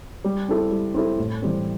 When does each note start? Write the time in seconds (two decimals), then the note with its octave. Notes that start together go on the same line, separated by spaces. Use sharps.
0.24 G3
0.48 C4 E4 A4
0.71 G3
0.94 C4 E4 A4
1.18 A2
1.42 E3 G3 C4